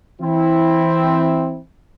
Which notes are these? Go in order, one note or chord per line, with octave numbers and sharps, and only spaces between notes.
E3 C4 E4